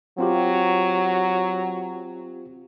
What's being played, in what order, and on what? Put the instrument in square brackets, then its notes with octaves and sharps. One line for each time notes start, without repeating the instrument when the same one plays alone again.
[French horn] F#3 [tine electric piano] C4 F4 G4